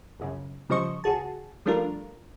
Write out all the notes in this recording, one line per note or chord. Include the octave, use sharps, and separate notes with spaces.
A#1 F#2 C#3
C#3 F3 G3 C5 D#5 C#6
C#2 F#4 G#4 A5
F3 G3 A3 D4 F4 A#4